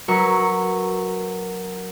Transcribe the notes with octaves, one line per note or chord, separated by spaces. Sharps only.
F#3 A#4 B4 C#6 E6